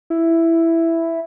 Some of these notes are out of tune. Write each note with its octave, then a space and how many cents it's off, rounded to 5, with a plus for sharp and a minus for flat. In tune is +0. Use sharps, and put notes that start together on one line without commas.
E4 +5